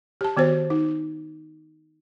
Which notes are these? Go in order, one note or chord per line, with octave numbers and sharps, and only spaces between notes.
G4 A5
D#3 B3 F#4 C5
D#4